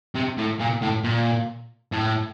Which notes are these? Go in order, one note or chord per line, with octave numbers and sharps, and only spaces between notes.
C3
A2
A#2
A2
A#2
A2